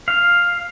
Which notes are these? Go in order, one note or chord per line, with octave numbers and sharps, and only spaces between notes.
F5